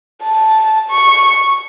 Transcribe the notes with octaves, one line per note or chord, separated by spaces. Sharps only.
A5
C#6